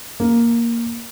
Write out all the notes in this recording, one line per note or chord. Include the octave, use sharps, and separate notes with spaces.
A#3